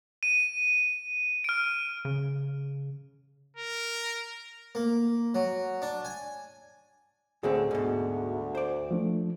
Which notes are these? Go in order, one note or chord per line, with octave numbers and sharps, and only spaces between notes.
D#7
F6 D7
C#3
A#4
A#3
F#3
D4
G#5
D2 A2 D3 C4 G#4
G#2 B2
C5 D5
F3 A3 D4